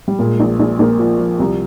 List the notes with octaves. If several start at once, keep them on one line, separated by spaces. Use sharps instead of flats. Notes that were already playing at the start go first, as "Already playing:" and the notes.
G3
A#2 G#3
A#1
A#1
A#1 A#3
F3
F3
C2